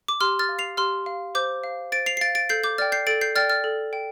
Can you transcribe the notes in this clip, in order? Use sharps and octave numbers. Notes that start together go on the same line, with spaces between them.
D6
G4 C6 F6
F6 A6
F5
C7 F7
G4 C6 F6
F5
C5 D6 G6
F5
C5 A6 D7
C7 F7
C7
F5 A6 D7
A6 D7
A4 G6 C7
D6 G6
D5 G5 F6 A6
G6 C7
A4 A6 D7
G6 C7
D5 G5 F6 A6
F6 A6
A4
G5